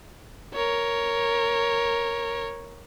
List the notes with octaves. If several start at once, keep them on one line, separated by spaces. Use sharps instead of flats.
A#4 C#5